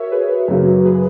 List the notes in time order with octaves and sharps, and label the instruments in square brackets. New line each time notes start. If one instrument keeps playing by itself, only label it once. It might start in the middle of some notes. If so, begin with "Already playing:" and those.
Already playing: [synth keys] F#4 A#4 C#5 E5
G#4 B4
[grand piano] F#2 C#3 F#3 A#3
[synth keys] G#4 B4